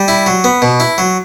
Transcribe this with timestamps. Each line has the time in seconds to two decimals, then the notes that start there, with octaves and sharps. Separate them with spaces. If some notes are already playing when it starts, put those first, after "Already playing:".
Already playing: G3
0.08 E4
0.26 F#3
0.44 B3
0.62 B2
0.80 E4
0.98 F#3